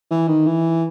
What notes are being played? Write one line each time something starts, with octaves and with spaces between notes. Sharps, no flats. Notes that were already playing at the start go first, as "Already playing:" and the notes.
E3
D#3
E3